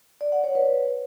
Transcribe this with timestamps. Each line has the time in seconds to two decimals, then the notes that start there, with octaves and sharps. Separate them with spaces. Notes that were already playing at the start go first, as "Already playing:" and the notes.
0.21 D5
0.32 F#5
0.44 C#5
0.55 B4